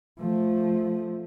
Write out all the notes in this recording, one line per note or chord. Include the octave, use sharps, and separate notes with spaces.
F3 A3